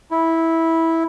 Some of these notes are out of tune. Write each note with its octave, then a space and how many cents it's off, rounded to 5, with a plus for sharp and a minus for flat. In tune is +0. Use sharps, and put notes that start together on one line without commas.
E4 -10